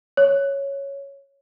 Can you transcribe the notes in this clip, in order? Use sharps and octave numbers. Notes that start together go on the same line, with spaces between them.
C#5